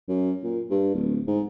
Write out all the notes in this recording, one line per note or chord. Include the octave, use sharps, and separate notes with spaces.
F#2
A#2
G2
D1
G#2